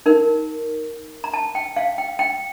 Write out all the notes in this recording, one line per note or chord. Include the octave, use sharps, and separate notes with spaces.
D#4 A#4
A#5
A5
G5
F5
G5
G5